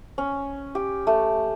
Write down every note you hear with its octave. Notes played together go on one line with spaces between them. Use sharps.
C#4
G4
A3